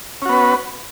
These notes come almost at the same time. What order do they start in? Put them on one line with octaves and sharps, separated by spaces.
C#4 F#4 B3 B4